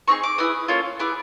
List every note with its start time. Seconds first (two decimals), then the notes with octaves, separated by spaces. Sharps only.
0.08 C4 D#4 G#4 C#6
0.23 D6
0.38 B3 E4 G#4 D#6
0.68 A#3 C#4 F4 A4
0.99 B3 E4 G#4 D6